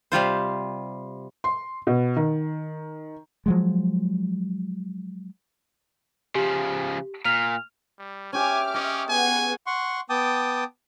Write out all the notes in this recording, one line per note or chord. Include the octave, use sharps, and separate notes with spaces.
C3 G3 F4 C5
C6
B2
D#3
F3 F#3 G#3
C#3 F3 G4
A#2 F6 F7
G3
C#4 G4 E5 G#5 D6 F6
C#4 D#5
B3 G#4 F#5 G#5
F#5 C6 C#6
B3 G5 A5 D6 D#6